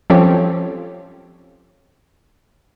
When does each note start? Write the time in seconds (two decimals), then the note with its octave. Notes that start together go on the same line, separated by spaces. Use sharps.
0.10 F3 C4 C#4 G4 A4 C#5